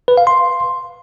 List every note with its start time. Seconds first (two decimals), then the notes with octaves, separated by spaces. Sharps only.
0.08 B4
0.17 F5
0.27 C6